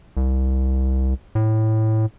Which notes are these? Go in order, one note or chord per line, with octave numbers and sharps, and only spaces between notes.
C2
A2